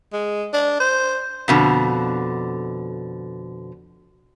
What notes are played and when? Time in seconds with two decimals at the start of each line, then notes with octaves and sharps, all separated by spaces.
0.13 G#3
0.53 D4
0.80 C5
1.48 F2 B2 D3